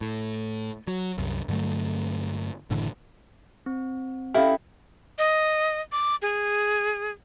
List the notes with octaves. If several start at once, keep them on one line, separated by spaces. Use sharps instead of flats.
A2
F#3
C2 F#2
G2 D3 F#3 A3
F#1 A2 D3 E3
C4
C#4 E4 G4 A4 F5 G5
D#5
D6
G#4